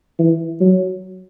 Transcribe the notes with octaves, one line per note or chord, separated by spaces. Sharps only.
E3
F#3